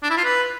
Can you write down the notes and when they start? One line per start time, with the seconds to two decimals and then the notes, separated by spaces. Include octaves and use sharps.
0.03 D4
0.10 E4
0.17 F4
0.25 B4